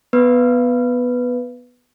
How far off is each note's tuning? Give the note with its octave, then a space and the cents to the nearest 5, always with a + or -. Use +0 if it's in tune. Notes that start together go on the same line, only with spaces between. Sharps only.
B3 +0 B4 +0